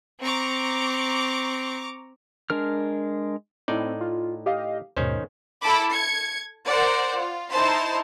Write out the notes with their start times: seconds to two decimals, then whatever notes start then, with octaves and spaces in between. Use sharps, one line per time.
0.21 C4 A#5 C#6 D6
2.50 G#3 D4 A#4 F6
3.68 A2 C4 D#4 E4 D5
4.01 F4
4.46 G4 D#5 F5
4.97 D#2 G#2 B2 D#3 C#4 C5
5.61 E4 A4 A5 B5 D6
5.91 G#6 C#7
6.66 A#4 C5 D5 F#5
7.15 F4
7.51 D#4 E4 C5 A5 C6